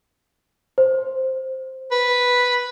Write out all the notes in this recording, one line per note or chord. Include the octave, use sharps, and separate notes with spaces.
C5
B4